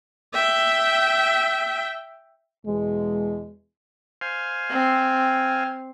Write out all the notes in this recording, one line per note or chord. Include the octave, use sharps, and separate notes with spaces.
E5 G5
E2 B2 G#3
C5 F5 G#5
C4